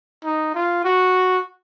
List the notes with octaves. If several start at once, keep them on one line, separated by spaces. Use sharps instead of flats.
D#4
F4
F#4